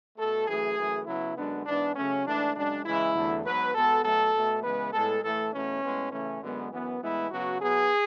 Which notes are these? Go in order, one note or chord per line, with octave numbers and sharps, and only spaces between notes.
B2 A3 A4
F#2 E3 A3 G#4
F#2 E3 A3
C#3 F#3 B3 E4
F#2 D3 G#3 B3 D4
G#2 E3 B3 D4
C#3 F#3 A3 C#4
G#2 E3 A3 D4
F#2 C#3 G#3 D4
C#3 E3 G#3 E4
E2 D3 F#3 A3
G#2 F#3 B3 B4
B2 G#3 B3 A4
B2 F#3 A3 A4
B2 A3
C#3 E3 G#3 B3 B4
A2 G#3 B3 A4
A2 E3 A3 A4
E2 B2 A3 C#4
A2 G#3 B3
C#3 E3 A3 C#4
F#2 D3 G#3 B3
F#2 E3 B3
A2 E3 G#3 B3 E4
C#3 F#3 B3 F#4
B2 F#3 B3 G#4